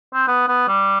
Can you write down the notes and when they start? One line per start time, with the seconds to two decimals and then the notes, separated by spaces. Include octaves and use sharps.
0.14 C4
0.28 B3
0.48 B3
0.68 G3